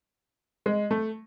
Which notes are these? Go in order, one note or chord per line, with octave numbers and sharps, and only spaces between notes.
G#3
A3